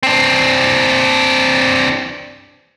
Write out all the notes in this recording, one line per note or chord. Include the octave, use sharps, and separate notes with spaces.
C4 D4